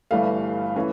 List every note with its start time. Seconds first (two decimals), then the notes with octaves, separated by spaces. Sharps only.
0.11 G1 G2 E3 A3 F5
0.76 E3 A3 C#4